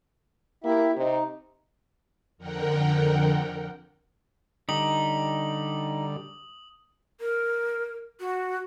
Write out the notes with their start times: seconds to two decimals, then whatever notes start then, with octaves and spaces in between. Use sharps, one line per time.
0.64 A#3 E4 G4 E5
0.97 C3 D#4
2.38 F2 D3 A#4 F#5 G5
4.69 D3 G3 D#4 G4 D#6 F#7
7.20 A#4
8.20 F#4